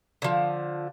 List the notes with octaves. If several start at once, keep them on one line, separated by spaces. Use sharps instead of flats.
D3 F3